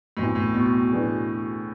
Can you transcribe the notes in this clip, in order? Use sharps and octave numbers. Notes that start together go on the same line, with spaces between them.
D2 A2 C3 E3 B3
A2
B2
A2 E3 B3 D4 G#4